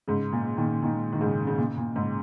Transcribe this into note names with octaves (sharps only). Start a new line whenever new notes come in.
G#2 C#3
A#2
A#2 D#3
A#2 D#3
D#3
G#2 C#3
C#3
A#2
A#2
G#2 C#3